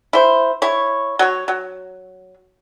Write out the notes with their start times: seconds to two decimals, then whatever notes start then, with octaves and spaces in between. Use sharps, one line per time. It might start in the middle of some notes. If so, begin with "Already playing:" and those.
0.13 E4 C5
0.62 E4 C#5
1.19 F#3 C#5
1.48 F#3